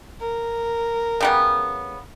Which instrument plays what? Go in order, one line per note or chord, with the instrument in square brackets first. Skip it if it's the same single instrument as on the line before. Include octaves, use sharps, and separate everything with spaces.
[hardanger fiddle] A#4
[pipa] C#3 G3 B3